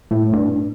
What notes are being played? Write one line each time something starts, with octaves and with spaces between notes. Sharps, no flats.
A2
G2